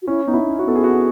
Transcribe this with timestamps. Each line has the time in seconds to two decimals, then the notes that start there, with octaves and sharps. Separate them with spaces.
0.02 F#4
0.07 C#4 E4
0.26 B3 D#4
0.34 E4
0.46 C#4
0.59 F#4
0.65 B3 A4
0.75 G#4
0.83 F#4